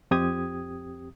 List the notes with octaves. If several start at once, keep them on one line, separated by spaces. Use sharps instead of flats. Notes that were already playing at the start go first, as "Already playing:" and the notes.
F2 C4 G4 D#6 G#6